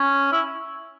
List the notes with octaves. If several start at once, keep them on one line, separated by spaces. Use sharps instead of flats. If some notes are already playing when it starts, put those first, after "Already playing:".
Already playing: C#4
E4